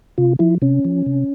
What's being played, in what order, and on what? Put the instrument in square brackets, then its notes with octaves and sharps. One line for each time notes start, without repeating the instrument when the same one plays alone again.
[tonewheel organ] C3 F4
F3 E4
C3 C#4
F3
C3